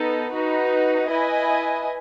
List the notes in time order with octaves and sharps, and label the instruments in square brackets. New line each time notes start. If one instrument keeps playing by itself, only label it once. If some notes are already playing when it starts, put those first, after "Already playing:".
Already playing: [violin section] B3 D#4 A4
D#4 F#4 B4
E4 B4 D#5 G#5